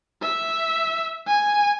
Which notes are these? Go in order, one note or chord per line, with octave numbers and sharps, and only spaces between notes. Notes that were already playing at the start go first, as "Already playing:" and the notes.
E5
G#5